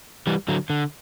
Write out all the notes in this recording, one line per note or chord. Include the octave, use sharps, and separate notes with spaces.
E3 G3
D3 F#3
D3